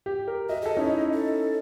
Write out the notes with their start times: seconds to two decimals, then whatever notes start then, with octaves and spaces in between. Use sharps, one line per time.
0.06 G4
0.28 A#4
0.49 F#4 D#5 E5
0.62 G#4 A4 D#5
0.77 C#4 D#4 E4
1.14 A4